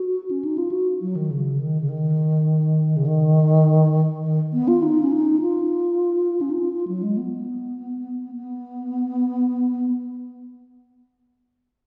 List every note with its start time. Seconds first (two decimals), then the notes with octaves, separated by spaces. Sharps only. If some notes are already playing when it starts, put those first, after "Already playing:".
Already playing: F#4
0.31 C#4
0.45 D#4
0.58 F4
0.72 F#4
1.01 F#3
1.16 D#3
1.31 C#3
1.60 D#3
1.81 C#3
1.89 D#3
2.97 C#3
3.06 D#3
4.24 D#3
4.53 B3
4.68 F4
4.82 D#4
5.02 C#4
5.12 D#4
5.41 F4
6.41 C#4
6.50 D#4
6.59 F4
6.73 F4
6.88 F#3
7.03 G#3
7.17 B3
8.35 B3